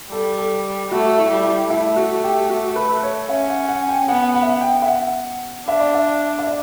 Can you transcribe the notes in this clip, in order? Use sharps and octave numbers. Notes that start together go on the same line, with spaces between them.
G3 A4
A4
A3 F#4
E4
G3
E4
A3 E4
F#4
G4
F#4
B4
C#5
C#4 E5
F#5
F#5
G5
B3 F#5
F#5
E5
F#5
G5
E5
F#5
D4 E5
D5
E5
E5
D5